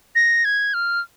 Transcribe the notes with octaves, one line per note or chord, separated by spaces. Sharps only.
A#6
G#6
F6